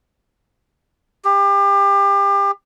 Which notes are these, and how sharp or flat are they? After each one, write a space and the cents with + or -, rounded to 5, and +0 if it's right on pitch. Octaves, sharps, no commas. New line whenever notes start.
G4 +30